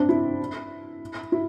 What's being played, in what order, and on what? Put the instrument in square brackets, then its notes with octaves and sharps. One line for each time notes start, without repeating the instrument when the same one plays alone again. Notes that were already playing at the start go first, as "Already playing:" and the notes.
Already playing: [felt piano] C4 D4
E4
E4